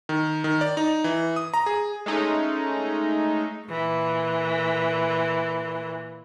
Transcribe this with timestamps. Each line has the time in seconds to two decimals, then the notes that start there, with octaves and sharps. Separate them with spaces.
0.09 D#3
0.44 D#3
0.61 D5
0.77 D#4
1.04 E3
1.36 D#6
1.54 A#5
1.66 G#4
2.06 G#3 A3 C#4 D#4
3.68 A#2 E3